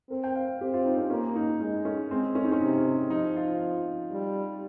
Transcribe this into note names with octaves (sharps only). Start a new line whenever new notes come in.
C4 A#4
G5
F5
C4 G4
F4
D#4
C#4
A#3 C#4
D#4
G#3 D#4
C#4
G#3 C4
C#4
D#4
C#4
C3 D#4
F3 D#4
F4
G3